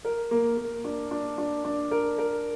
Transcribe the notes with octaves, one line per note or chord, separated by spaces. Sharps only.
A#4
A#3
A#3
D4
D4
D4
D4
A#4
A#4